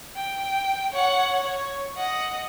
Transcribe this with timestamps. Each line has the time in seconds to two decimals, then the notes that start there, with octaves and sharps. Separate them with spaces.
0.16 G5
0.93 C#5 F#5
1.44 C#5
1.97 D#5 F#5